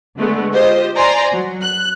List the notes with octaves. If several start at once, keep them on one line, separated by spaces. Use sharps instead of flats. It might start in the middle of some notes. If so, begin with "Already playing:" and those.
D3 G#3 A3 B3
F4 G4 C5 D#5
C5 D5 G#5 A#5 C6
F#3
F#6